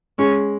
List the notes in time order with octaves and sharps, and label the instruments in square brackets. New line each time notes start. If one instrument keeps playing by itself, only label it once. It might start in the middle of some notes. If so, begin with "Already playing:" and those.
[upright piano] G#3 [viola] C#4